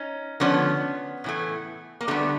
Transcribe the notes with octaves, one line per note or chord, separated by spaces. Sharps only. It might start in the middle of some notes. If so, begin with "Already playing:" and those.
Already playing: C#4 D#4
D3 F3 A3 B3 C#4
A2 E3 A3
A#3
D3 G3 A3 B3